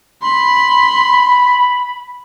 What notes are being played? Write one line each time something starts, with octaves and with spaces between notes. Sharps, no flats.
B5 C6